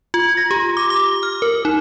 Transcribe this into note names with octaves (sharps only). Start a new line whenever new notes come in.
F4
A#6
G4
D6
D6
F6
A#4
D#4